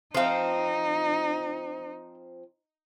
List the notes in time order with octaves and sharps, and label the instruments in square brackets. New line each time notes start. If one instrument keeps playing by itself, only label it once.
[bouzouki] F3 C4 [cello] D#4 [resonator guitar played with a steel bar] C5 F5